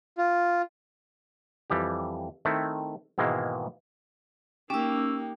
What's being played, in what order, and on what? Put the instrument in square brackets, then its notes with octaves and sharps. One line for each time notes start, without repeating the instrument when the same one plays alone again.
[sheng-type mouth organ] F4
[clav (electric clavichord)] F2 E3 G3 G4
D#3 A3 C4 E4
G#2 B2 D#3 E3 G#3 A#3
[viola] A#3 D#4 [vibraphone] C#4 E6 [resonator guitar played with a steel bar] G4